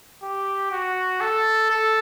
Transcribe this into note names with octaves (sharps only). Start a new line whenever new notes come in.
G4
F#4
A4
A4